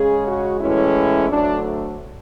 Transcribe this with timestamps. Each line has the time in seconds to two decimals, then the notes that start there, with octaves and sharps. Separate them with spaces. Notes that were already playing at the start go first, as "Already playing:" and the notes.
Already playing: C#3 G#3 C#4 G#4
0.26 F#4
0.60 A2 E3 G#3 C#4 E4
1.29 D2 D3 F#3 A3 D4